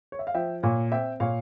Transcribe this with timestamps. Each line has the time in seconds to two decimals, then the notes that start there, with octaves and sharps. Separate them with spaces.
0.12 C#5
0.19 E5
0.27 F5
0.34 F3 E5 G5
0.63 A#2 C#5 F5
0.92 C4 E5 G5
1.20 A#2 C#5 F5